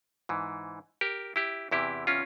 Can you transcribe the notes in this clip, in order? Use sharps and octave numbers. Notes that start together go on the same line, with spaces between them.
G#2 E3
G4 A#4
E4 G4
E2 C3 E3 E4 G4
C#4 F4